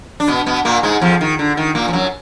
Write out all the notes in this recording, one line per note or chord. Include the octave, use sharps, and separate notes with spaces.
D4
B2 B3
B2 B3
A#2 A#3
G#2 G#3
F2 F3
D#3
D3
D#3
A#2 A#3
F3
F#2 F#3